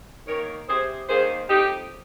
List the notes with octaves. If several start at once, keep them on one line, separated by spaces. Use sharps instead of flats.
D#3 A#3 A#4 C#5
C3 G#4 C5
D#3 A#3 G#4 C5
F2 D#4 G4